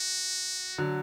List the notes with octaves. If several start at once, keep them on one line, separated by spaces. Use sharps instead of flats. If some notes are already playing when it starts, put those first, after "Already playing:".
Already playing: F#4
D3 F#3